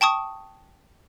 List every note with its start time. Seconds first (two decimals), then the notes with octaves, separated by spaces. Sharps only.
0.01 G5 A5 C#6 D#6